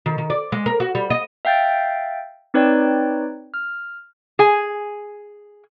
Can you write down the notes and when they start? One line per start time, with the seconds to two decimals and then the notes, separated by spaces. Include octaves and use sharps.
0.06 D#3
0.18 D#3
0.30 D5
0.52 G#3
0.66 A#4
0.80 F#4
0.95 G3
1.10 D#5
1.45 E5 F5 G5 G6 A6
2.54 C4 D#4 B4 C#5 D5 G5
3.54 F6
4.39 G#4 G#5